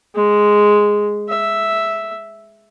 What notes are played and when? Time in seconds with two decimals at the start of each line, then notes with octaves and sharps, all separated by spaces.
0.15 G#3
1.29 E5